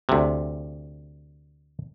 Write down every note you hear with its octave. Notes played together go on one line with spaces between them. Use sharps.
D2 C3